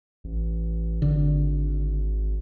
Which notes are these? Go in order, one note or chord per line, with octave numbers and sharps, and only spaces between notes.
A1
G#1 D3